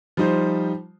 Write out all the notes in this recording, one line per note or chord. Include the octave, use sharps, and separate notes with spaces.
F3 G3 D#4 F4 C5